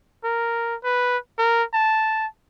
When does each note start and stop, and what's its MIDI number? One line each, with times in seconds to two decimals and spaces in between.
0.24 0.75 70
0.84 1.17 71
1.38 1.63 70
1.74 2.26 81